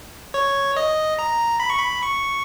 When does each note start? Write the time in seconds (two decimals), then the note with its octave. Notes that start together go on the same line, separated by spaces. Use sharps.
0.34 C#5
0.77 D#5
1.19 A#5
1.60 B5
1.70 C#6
1.79 B5
2.03 C#6